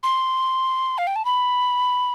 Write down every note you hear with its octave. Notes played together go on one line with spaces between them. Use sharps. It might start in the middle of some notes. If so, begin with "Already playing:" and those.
C6
F5
G5
A5
B5